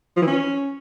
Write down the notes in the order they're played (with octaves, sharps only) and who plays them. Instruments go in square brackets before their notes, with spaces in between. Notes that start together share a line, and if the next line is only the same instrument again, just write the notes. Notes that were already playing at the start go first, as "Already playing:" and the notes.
[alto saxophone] F3
E3
C#4